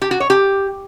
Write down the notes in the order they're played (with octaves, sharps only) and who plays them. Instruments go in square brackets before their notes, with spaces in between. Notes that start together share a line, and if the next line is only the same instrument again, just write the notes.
[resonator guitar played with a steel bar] G4
F#4
C#5
G4